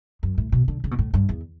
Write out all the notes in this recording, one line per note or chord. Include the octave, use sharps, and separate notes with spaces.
F#2
A2
B2
D3
C#3
B2
A2
G2
E2